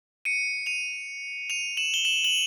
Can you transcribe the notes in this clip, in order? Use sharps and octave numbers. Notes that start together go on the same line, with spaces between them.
C#7 D#7
D#7 F7
D#7 F7
E7 F#7
G7
E7 F#7
F#7